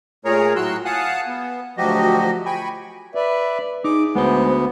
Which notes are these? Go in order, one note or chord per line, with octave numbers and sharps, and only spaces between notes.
A#2 A3 G#4 A#4 C#5 A#5
A2 F#3 F#4 C6 E6 F#6
F5 F#5 G#5 A5 D#6 F#6
B3
D2 F3 F#3 F#4 G4 D#5
G5 G#5 B5 C#6
B4 D5 E5
D#4 G#4 D6
D2 G#3 B3 C5